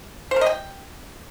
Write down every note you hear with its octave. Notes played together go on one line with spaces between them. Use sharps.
C5
A#4
D#5
G5